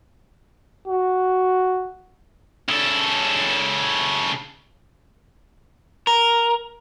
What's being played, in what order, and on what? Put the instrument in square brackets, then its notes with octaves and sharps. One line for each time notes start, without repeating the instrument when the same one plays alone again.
[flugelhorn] F#4
[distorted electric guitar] C#3 A4
[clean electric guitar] A#4